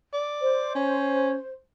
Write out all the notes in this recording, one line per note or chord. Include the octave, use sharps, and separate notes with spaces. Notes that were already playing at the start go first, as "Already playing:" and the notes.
D5
C5
C#4